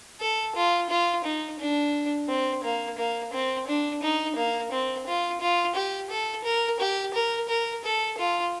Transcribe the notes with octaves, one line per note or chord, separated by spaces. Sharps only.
A4
F4
F4
D#4
D4
C4
A#3
A#3
C4
D4
D#4
A#3
C4
F4
F4
G4
A4
A#4
G4
A#4
A#4
A4
F4